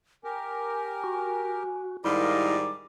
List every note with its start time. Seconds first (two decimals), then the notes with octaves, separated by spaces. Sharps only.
0.24 G4 A#4 G#5
1.04 F#4
2.05 G#2 D#3 G3 E4 A#4 D#5 F5 D6